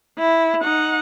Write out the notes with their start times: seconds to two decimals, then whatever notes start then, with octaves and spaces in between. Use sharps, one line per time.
0.18 E4
0.62 D#4 F#5